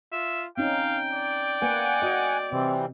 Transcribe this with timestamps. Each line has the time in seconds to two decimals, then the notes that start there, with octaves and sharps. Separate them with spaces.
0.12 F4 E5
0.57 C4 C#4 D#4 F5 G5
1.13 D5
1.62 A#3 B4 F#5 G#5
2.02 F#4 D#5
2.52 C3 E3 G3 C4